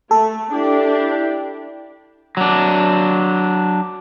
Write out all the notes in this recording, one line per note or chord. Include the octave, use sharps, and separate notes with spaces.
A3 A4
D4 E4 G4
F#3 D4